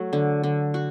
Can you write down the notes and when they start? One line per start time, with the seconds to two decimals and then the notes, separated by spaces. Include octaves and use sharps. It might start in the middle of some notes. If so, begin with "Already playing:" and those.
Already playing: F#3 A3
0.13 D3
0.43 D3
0.74 F#4